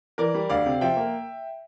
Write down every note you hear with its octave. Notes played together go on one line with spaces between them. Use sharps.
E3 A#4 D5
G3
D2 D5 F5
C3
F3 E5 G5
A#3